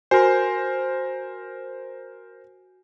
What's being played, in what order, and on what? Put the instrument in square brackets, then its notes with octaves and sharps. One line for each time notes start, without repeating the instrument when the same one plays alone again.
[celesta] F#4 G#5 [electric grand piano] A#4 C5